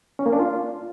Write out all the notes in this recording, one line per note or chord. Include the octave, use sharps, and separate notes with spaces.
C#4
A#3
D4
F4